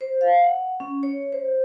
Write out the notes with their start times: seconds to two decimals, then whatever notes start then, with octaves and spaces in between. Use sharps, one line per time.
0.01 C5
0.21 F5
0.42 F#5
0.80 C#4
1.03 C#5
1.32 C5